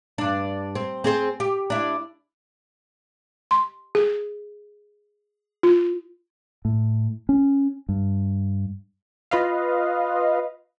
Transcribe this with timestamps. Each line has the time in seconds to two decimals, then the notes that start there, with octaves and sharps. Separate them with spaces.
0.18 G2 D4
0.75 C4
1.04 C4 G#4 C5
1.40 G4
1.70 D4 E4
3.51 C6
3.95 G#4
5.63 F4
6.65 A2
7.29 C#4
7.89 G2
9.31 F4 B4 D#5 F5